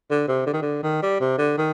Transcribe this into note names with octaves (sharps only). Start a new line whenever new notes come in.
D3
C3
D3
D#3
D3
D#3
G3
C3
D3
D#3